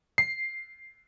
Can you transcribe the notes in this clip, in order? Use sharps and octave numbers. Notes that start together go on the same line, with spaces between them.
C7